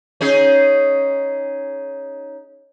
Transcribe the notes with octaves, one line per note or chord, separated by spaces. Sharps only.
C#4 D#4 G#4